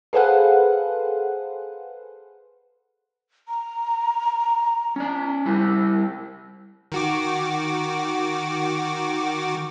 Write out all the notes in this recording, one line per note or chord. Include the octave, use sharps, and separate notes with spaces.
G#4 A4 B4 C5 F5 F#5
A#5
C#4 D5
G3 E4 G4
D#3 F#4 D6